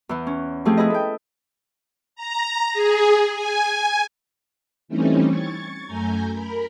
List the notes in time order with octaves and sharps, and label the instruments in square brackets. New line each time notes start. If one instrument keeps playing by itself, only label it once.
[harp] E2 E3
C#4
F3 A3 C4 G4 G#4
E4 G#4 B4 D#5
A4 G5
[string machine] A#5
G#4
G#5
E3 G3 A3 C4 C#4 D#4
C#6 G#6 A6
F#2 A3 G#5 A#5 G6
A#4 B5